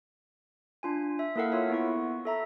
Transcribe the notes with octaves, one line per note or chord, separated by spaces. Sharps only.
D4 F4 G#5
E5
A#3 E4 A4 A#4 F5 F#5
F4 C#5 E5
B3 E4 C#6
A4 E5 A#5